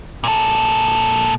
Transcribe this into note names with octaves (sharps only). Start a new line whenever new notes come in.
A#2 A4